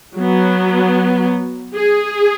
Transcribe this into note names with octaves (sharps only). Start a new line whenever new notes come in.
F#3 B3
G#4